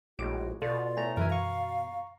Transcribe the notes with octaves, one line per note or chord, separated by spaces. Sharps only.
A#1 A2 G#3 F#4 D6 D7
B2 F4 A4 D5
A2 A3 G#5 A#5
F#2 E3 A#4 B4 E5 G#5
F5 A#5 C#6